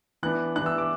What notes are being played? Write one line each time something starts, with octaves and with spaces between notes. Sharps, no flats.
E3 B3 D4 F#6
E3 B3 D4 F#6
E6
D6